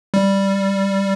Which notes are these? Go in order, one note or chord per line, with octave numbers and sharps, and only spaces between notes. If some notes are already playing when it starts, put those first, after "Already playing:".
G3